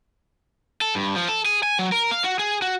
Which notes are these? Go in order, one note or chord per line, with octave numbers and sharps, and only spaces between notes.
A4
G2
F3
A4
G#4
G#5
F#3
A#4
F5
F#4
G#4
F#4